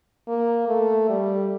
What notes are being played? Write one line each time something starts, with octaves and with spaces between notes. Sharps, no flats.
A#3
A3
G3